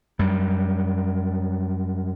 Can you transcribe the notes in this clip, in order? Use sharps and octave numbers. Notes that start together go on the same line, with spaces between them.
F#2 G3